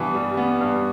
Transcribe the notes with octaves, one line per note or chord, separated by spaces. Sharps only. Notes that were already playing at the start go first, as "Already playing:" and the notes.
Already playing: G2 E3 G3 B3
G3
B3
G2